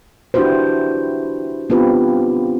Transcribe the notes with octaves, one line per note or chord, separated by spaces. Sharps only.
D4 E4 F#4 G4 B4 C5
B3 C4 D4 F4 G4 B4